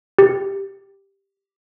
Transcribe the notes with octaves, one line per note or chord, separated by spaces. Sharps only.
G4